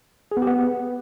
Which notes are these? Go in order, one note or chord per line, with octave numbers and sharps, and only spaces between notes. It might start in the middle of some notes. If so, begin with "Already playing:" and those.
G#4
B3
G4
B3